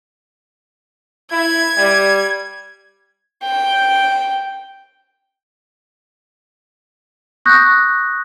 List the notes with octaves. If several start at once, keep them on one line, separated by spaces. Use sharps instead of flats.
E4 G#6
G3
G5
C#6 D#6 F#6 G6 A#6